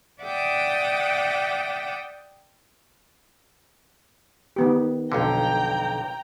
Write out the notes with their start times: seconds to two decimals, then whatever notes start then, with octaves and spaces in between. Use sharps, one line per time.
0.23 D5 E5 F#5 G5 D6 D#6
4.56 D#3 B3 G4
5.12 B1 F2 D3 G5 A#5